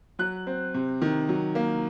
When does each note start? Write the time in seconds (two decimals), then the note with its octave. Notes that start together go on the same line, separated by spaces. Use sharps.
0.19 F#3 F#6
0.47 C4
0.74 C3
1.02 D#3
1.29 F#3
1.55 A#3